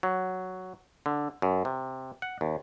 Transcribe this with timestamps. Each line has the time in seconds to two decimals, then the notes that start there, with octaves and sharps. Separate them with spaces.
0.03 F#3
1.06 D3
1.42 F#2
1.65 C3
2.22 F#5
2.41 D#2